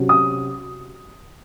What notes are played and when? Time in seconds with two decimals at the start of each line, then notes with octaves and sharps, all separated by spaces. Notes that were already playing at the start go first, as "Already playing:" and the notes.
Already playing: C3 F#3 C#4
0.09 D#6